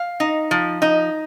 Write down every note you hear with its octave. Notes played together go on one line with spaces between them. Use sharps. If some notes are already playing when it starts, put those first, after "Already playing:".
Already playing: F5
D#4
F3
D#4